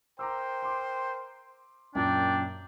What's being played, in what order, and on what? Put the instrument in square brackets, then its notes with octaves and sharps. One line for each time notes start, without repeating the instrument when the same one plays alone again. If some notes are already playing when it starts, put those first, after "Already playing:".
[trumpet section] A#4 C5 G5 [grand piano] A#5 D6 E6
[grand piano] C6 D6
[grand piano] F#2 A#2 [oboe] D4 [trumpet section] G5